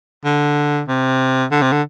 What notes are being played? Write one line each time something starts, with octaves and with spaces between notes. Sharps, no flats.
D3
C3
D3
C3
D3